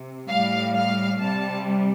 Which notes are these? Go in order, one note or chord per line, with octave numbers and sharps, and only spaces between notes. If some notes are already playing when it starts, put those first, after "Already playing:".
Already playing: C3
A2 G3 F5
F5
C3 G3 A5